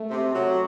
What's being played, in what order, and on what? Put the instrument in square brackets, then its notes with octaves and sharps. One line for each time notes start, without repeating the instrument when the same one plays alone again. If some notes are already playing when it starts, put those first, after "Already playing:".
Already playing: [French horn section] A3
[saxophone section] C3
F#3